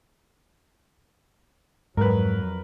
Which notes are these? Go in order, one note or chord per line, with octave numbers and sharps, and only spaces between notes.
F2 G#2 F#3 A#4 B4